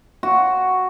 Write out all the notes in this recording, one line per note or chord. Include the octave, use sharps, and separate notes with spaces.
F#4